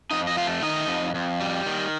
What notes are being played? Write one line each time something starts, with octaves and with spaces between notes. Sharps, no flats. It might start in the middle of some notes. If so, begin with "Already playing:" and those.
F2 D#4 D#5
D#5
A3 F4 F5
D#3 D#4 D#5
F2
F2
G3
D#3